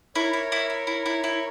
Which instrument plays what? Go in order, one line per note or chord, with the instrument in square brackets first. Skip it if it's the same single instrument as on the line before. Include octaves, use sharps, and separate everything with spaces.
[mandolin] E4 [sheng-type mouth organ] A#4 C#5
[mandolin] E4
E4
E4
E4
E4
E4